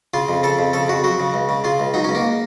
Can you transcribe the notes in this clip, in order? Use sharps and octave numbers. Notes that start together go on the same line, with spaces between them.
C#3 F4
F2
C#3 A4
F2
C#3 A4
F2 F#4
F#3 F#4
C#3
C#2
C#3
C#3 F4
C#2
F#3 D#4
C#4
C#2
A#3